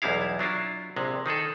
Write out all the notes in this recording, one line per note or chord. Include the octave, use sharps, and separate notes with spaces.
B1 E2 G3 G#3 E4 F5
F#3 D4 E4 F4
A#1 C3 G#3
D#3 D#4 G#4 A4